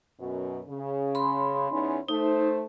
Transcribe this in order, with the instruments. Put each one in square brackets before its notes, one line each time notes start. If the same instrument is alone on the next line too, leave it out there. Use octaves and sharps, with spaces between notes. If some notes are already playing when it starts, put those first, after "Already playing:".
[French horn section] F#2 B2
C#3
[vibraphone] B5 C6
[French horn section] E2 C#4 D#4
[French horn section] A3 C5 [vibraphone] D#4